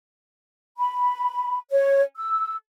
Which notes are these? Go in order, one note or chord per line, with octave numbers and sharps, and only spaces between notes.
B5
C#5
E6